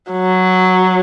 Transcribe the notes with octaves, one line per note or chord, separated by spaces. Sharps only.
F#3